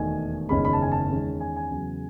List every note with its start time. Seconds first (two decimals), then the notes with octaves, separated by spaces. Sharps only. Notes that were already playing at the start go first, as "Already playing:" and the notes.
Already playing: E1 D#2 D#3 A3 G#5
0.49 F#1 E2 D#3 G#3 C#4 B5
0.65 B5
0.73 A5
0.82 G#5
0.92 A5
1.10 E2 D#3 G#3 C#4
1.40 G#5
1.56 G#5
1.71 E2 C#3 F#3